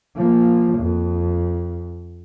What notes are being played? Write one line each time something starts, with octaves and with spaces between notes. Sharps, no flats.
F3 A#3
F2